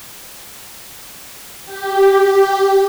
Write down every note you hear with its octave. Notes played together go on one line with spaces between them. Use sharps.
G4